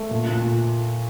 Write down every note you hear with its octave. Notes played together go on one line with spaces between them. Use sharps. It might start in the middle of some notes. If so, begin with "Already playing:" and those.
Already playing: A3
A#2
A#2